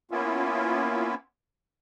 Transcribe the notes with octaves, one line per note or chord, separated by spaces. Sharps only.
A#3 B3 C#4 E4 F4